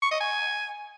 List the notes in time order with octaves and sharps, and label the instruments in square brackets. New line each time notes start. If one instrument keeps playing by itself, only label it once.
[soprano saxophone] C#6
D#5
G#5